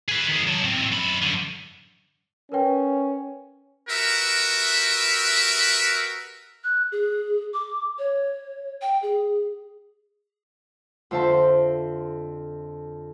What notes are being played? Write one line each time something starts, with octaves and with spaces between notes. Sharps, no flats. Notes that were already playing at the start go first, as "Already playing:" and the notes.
G#4 B4
D#3 G#4
F#3 A5
A2 C4
F#2 B5
F#2 D3
C#4 A#4 B4 G5
F#4 G4 A#4 B4 E5
F#6
G#4
D6
C#5
G5
G#4
F2 D3 C5 E5 A5 C6